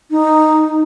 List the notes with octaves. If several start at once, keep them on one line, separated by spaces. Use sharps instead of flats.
D#4